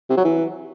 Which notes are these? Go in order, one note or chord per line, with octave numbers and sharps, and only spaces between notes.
C3
F#3
E3